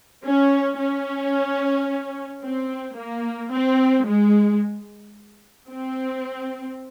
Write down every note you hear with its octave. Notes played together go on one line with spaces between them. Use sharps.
C#4
C#4
C4
A#3
C4
G#3
C4